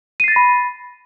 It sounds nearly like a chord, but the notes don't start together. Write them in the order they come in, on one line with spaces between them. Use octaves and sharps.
D#7 C7 A6 A#6 B5